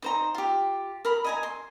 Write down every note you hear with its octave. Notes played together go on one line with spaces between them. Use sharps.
D#4 C5 A#5
F4 G4
A#4 B5
D#5 G#5 A#5
C6